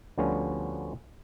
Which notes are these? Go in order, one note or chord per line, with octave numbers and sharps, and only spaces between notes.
D2 D3 F3 G3 B3 C#4